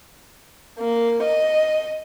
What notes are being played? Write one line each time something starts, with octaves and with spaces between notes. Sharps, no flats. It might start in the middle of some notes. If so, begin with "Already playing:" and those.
A#3
D#5